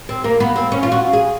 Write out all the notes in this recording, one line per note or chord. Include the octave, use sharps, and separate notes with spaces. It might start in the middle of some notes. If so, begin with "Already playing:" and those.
C4
A#3
B3
C4
C#4
F4
F#4
G#4